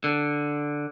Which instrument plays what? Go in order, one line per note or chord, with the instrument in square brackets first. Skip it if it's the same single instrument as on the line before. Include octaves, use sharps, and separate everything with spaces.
[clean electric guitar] D3